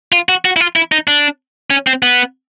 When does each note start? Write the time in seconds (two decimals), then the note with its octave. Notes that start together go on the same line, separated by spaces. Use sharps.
0.12 F4
0.29 F#4
0.45 F#4
0.56 E4
0.60 F4
0.76 E4
0.92 D#4
1.07 D4
1.70 C#4
1.87 C4
2.03 B3